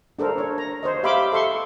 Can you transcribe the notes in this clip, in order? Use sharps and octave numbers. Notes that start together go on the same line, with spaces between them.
D4 A4 A#4 C5
C#5
A#5
C5 C#5 D#5
G4 E5 F5 B5 C6 D6
A4 E5 C6 C#6